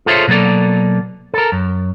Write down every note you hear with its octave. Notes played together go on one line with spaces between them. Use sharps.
F4 G#4 A4 C5 C#5 E5
B2 F#3 A#3 A4 D5
A4 A#4
F#2